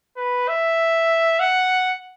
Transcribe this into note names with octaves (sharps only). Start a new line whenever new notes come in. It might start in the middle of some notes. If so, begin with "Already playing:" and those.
B4
E5
F#5